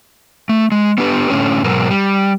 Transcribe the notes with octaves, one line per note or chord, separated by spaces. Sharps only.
A3
G#3
B3 D4 G4 B4
A2 D3 C#4
G#2 B2 F#3 A#4
G3